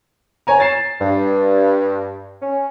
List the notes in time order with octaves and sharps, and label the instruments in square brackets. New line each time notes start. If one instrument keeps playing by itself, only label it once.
[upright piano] C#5 G#5 A#5
A6 C7 E7
[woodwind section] G2
C#4